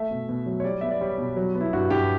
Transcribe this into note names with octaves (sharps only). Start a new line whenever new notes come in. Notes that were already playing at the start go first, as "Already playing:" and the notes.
Already playing: A3 E5
B2
B2
F#3
C#5
G3 D5
B3 E5
D5
G3 C#5
B2
F#3
B3
E4
G2 F#4
G2 G4